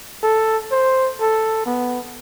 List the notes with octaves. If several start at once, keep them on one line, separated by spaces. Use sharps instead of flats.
A4
C5
A4
B3